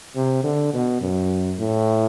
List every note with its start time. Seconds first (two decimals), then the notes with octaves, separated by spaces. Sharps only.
0.16 C3
0.43 D3
0.73 B2
1.01 F#2
1.59 A2